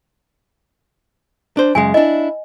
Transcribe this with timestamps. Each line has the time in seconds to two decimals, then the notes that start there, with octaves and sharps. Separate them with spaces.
1.57 D4 C5
1.75 F#2 C#3 G#3 G#5
1.94 D4 E4 D#5